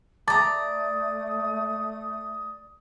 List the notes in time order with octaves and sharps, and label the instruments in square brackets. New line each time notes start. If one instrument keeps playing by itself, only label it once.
[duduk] A3 [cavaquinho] D5 A#5 [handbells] A5 D6 A6 [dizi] D#6